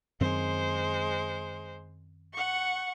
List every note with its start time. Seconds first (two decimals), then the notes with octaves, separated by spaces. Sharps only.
0.20 F#2 D#3 G#3 C4 C5
2.33 F#5 C#6